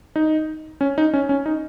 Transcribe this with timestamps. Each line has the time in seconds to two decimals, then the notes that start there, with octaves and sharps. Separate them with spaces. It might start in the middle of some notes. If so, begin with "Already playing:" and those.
0.16 D#4
0.81 C#4
0.98 D#4
1.14 C#4
1.29 C#4
1.46 D#4